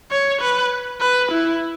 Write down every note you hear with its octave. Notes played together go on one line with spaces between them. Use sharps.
C#5
B4
B4
E4